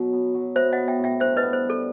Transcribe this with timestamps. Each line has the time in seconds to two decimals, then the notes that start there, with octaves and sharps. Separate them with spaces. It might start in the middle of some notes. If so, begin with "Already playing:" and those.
Already playing: B2 F#3
0.13 B3
0.35 F#3
0.55 B3 C5 E5
0.73 B3 D#5 F#5
0.88 E5 G5
0.99 A2
1.04 E5 G5
1.20 G2 C5 E5
1.37 B4 D#5
1.43 B3
1.53 C5
1.65 G3 A4